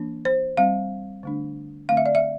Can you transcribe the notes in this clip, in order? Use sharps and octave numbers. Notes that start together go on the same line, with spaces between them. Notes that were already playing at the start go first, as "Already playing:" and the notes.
Already playing: E3 A#3 D4
C5
G3 C4 F5
D3 A3 D4
D3 A3 C4 F5
E5
D5
E5